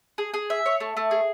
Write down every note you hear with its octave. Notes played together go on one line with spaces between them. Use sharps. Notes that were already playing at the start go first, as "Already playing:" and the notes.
G#4
G#4
E5
C#5
A3
A3
G#4